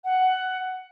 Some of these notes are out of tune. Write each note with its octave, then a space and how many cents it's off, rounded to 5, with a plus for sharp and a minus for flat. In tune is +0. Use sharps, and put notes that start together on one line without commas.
F#5 +10